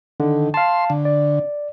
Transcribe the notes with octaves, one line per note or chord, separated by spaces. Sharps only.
D3 D#3
F5 A5 C6
D3
D5